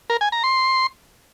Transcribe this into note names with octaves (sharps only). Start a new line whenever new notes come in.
A#4
G#5
A#5
C6